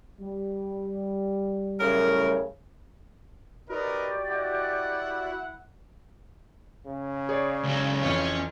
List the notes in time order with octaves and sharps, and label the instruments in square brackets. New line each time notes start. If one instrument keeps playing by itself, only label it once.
[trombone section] G3
[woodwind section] F#2 A2 C#3 [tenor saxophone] A#4
[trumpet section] D#4 A#4 B4 [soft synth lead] F#4 [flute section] G4 D5 D#5
[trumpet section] E4 F#5
[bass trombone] C#3
[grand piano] G#4 C#5 D5
[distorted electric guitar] C#2 F#3
[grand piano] F2 E3 [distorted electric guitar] C#4 C#5